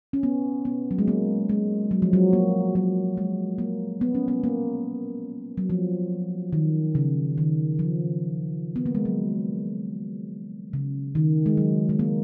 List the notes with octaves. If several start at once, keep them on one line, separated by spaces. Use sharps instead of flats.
C#4
B3
B3
F#3
G#3
A#3
G#3
F#3
F3
F#3
A#3
F#3
G#3
A#3
B3
C#4
B3
A#3
F#3
F3
D#3
C#3
D#3
F3
B3
A#3
G#3
F#3
C#3
D#3
G#3
F#3
G#3
A#3